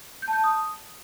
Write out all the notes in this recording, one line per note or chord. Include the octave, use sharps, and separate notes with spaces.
G6
A5
G6
A5
D#6